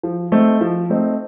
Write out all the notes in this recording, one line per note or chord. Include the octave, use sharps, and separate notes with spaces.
F3
A3 C4 D#4
F3
A3 C4 D#4